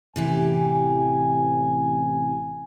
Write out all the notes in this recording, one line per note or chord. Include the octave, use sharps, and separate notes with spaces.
A1 C3 E3 G4 G#5